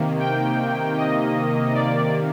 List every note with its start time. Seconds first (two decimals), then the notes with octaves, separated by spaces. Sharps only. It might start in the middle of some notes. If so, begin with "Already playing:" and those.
Already playing: C3 D#3 A#3
0.20 G5
0.97 D#5
1.74 D5